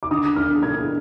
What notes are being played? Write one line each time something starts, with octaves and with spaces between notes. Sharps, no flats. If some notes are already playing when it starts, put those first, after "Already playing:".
D6
D3 D#6
D4 F6
D4 G#6